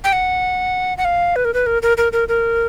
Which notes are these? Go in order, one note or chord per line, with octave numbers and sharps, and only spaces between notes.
G5
F#5
F#5
F5
B4
A#4
B4
A#4
A#4
A#4
A#4
A#4